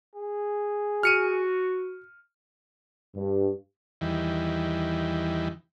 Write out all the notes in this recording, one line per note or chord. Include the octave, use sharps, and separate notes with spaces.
G#4
F#4 F6 C#7 D#7
G2
E2 D#3 E3 G3